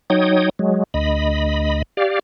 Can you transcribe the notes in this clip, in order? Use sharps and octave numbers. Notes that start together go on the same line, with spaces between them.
F#3 D#4 C#5 G5 D#6
F#3 G#3
D2 D#5 B5
G4 D5 F5